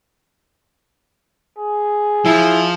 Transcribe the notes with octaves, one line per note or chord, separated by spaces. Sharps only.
G#4
F3 E4